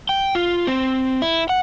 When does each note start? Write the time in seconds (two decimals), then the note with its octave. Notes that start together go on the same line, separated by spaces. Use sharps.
0.09 G5
0.35 F4
0.67 C4
1.22 E4
1.49 F#5